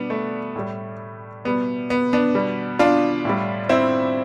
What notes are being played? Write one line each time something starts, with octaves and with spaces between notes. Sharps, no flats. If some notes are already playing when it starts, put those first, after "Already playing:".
Already playing: B2 G3 B3 D4
A3
A2 G3
B2 G3 B3
B3
B3 D4
B2 G3
D4 F4
A2 G3
C4 E4